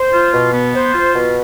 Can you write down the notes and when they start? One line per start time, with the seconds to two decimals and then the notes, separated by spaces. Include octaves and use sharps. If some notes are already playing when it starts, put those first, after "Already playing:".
Already playing: C5
0.13 F4
0.33 B2
0.53 B3
0.73 C5
0.94 F4
1.14 B2